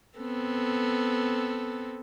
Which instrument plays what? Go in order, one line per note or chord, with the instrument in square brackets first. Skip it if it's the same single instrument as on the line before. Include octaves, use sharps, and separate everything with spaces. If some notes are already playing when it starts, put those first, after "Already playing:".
[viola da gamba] B3 C4 A4